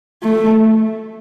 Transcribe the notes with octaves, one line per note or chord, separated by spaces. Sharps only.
A3